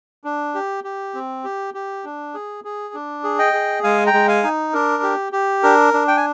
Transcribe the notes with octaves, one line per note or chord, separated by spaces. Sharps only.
D4
G4
G4
C4
G4
G4
D4
G#4
G#4
D4
G#4
D#5 G5
G#4
G#3 F5 G#5
G5 A#5
G#3
F5 G#5
D#4
D4 A#4
G4
G4
D4 A#4
D4
G5
G#5